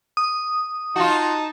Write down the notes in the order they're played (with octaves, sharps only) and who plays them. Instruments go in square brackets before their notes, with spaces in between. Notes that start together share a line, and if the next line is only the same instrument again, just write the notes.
[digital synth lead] D#6
[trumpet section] D#4 A5 [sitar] F4 F#4